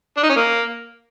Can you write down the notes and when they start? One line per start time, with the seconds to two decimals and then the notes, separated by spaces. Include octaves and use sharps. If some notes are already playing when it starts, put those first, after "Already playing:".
0.17 D4
0.23 D#4
0.30 C#4
0.36 A#3